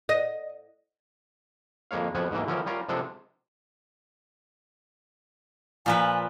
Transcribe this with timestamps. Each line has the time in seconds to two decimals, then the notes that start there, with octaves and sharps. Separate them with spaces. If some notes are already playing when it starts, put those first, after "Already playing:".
0.09 D#5
1.91 F2 G#3 A#3 C#5 F5
2.15 F2 B2 F3 F#5 G#5
2.31 G#2 B2 E3 A#3
2.47 D3 E3 F3 C#4 A#4
2.66 G3 C#4 F4 A#4
2.89 C3 F3 G#3 D4 A4
5.86 A#2 F3 B4 G#5